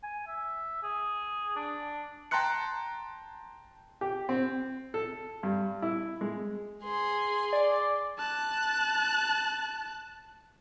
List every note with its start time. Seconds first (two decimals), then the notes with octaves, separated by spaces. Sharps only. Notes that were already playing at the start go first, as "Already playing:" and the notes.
0.03 G#5
0.27 E5
0.83 G#4
1.56 D4
2.31 G5 A5 A#5 C6 F#6 C#7
4.01 G4
4.29 C4
4.94 A4
5.43 G2
5.82 E4
6.21 G#3
6.83 G#4 C6
7.53 D5
8.19 A5 F#6